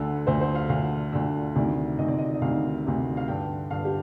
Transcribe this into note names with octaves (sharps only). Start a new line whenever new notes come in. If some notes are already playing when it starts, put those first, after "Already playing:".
Already playing: D2 D3 A4
D2 D3 C5
C5
F5
D2 D3 F5
D2 D3
D2 C3 D#3 D5
D2 C3 D#3 D#5
D5
D#5
D#5
D2 C3 D#3 F5
D2 C3 D#3
F5
G2 D3 G5
G2 D3 F5
G4